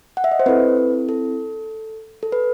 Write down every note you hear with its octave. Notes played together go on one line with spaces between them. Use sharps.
F#5
E5
D#5
C5
C4 E4 A4 B4
A4
A4
B4